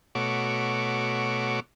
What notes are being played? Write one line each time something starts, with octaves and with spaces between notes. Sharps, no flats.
B2 A3 F#4 C#5 D6